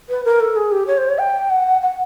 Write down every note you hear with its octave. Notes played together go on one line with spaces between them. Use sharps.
B4
A#4
A4
G#4
G4
C#5
C5
C#5
G5
F#5
F#5